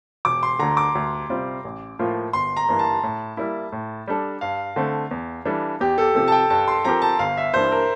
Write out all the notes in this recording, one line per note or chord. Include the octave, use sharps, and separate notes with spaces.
E1 D6
C6
D2 D3 A#5
D6
D2
C3 G3 C4 F4
A1
A2 F3 A#3 F4
G1 C6
A#5
G2 E3 A#3
A5
A2
G3 A#3 E4
A2
G3 D4 A4
G2 F5
D3 A3 C4
E2
E3 G3 D4 A4
E2 G4
A4
C3 F3 A4
A5
G5
G2 A5
C6
F3 C4 G4 A#4 A#5
A5
G1 F5
E5
G2 E3 A#3 D4 C5
A#4